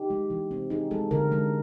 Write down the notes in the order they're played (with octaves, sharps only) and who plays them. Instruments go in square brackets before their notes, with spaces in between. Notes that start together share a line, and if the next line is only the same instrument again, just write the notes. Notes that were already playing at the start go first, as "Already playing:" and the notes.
Already playing: [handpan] D#4 G4
G#3
E3
C4
D#4 G#4
G#3 A4
D3 A#4
G#3